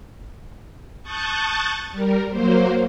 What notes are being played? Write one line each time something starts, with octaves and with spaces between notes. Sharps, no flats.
A5 C#6 D#6 F#6 G6 A6
G3 A#4
F#3 A#3 C5